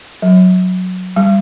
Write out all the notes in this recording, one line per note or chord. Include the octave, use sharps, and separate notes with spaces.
F#3
G3